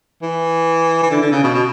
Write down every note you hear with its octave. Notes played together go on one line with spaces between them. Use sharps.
E3
E3
D3
D3
C#3
B2
B2